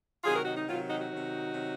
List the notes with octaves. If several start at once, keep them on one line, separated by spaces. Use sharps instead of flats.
C3 D#3 F#3 F4 G#4
F#4 A#4
D#4 F#4
D#4
C3 D#3 F#3 F4
D#4 F#4
D#4 F#4
C3 D#3 F#3
C3 D#3 F#3